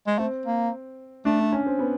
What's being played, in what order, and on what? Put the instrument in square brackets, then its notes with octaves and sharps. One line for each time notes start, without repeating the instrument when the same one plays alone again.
[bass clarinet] G#3
[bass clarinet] A3 [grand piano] C4
[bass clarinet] A#3
[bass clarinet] A3 [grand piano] D4
[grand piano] D4
C#4
C4
B3